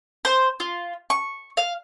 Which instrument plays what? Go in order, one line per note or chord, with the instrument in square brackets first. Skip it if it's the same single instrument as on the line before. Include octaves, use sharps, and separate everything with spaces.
[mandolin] C5
F4
C#6
F5